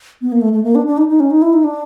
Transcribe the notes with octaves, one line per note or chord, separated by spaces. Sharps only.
B3
A#3
A3
A3
A#3
D4
D4
D#4
D#4
C#4
D#4
E4
D#4
D4